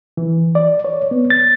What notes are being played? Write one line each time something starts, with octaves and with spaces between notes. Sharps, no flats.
E3
D5
C#5
B3
A6